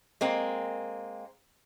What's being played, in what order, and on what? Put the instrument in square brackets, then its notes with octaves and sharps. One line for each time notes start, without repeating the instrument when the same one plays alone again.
[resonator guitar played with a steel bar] G#3 A#3 C4